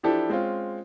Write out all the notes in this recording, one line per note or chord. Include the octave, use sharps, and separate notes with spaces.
E3 F3 D4 E4 G4 A4
G#3 C4 C#4 F4